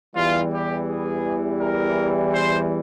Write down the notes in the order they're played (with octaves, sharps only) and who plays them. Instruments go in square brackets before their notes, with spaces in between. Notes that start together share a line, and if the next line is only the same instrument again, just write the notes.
[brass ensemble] E2 E3 G3 F4
G4
G#4
A#4
C5